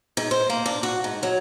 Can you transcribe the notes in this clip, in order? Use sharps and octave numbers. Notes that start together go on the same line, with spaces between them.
G#2
C5
A#3
D4
F#4
G#2
F#3